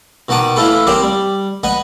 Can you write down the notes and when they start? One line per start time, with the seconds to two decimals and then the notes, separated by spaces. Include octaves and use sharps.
0.29 B2 D#3 F#5 A5 D6 D#6
0.56 E3 A3 E4 F4 A4 B4
0.87 C4 G4 A#4 C5 D5
1.02 G3
1.63 B4 D#5 F#5 G#5